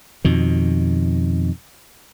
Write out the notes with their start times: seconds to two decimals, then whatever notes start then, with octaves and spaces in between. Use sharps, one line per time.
0.25 F2 B2 D#3